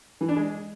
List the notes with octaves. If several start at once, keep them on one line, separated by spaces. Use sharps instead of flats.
E3
D4
G#3